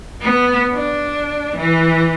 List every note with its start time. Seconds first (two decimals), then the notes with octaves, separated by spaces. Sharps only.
0.21 B3
0.74 D4
1.56 E3